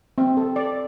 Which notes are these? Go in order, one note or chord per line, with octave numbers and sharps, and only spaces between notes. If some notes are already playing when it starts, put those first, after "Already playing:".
C4
A4
D5